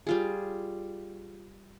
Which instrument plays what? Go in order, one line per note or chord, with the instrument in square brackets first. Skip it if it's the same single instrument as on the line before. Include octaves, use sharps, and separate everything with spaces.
[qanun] G3 F4 G#4